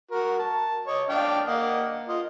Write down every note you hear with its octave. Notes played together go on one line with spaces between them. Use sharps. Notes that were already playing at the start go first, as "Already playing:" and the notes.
F#4 A#4
A5
C#5 D#5
D4 F5 G5
A#3 D#5 F#5
F4 D#5